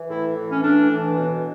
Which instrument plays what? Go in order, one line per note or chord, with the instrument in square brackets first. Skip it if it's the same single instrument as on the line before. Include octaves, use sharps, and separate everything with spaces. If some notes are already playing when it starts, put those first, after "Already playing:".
Already playing: [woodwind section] E3
A2 E4
E3
C#4
A2 D4
E3
B2